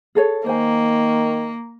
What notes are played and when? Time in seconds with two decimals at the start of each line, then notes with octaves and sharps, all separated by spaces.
0.15 G#4 A4 C#5
0.46 D#3 A#3 C5 G#5